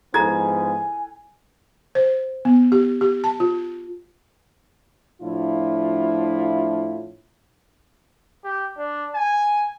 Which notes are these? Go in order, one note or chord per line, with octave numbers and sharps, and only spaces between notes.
G#2 F3 B3 E4 A4 G#5 A#5 G#6
C5
B3
G4
G4
A5
F4
A2 F3 D4 E4 F4
G4
D4
G#5